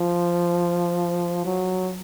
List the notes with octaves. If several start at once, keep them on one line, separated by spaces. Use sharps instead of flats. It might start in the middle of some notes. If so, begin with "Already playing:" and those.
Already playing: F3
F#3